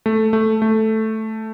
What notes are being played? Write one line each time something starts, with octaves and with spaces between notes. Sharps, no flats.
A3
A3
A3